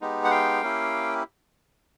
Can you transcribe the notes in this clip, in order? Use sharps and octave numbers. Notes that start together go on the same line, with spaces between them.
G#3 B3 D#4 G4
F#5
F5 G5
A#3 C#4 E4 G4